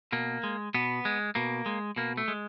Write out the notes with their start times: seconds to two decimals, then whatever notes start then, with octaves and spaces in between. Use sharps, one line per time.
0.12 B2 A#3
0.43 G#3
0.74 B2 B3
1.05 G#3
1.35 B2 A#3
1.66 G#3
1.96 B2 A#3
2.17 A3
2.28 G#3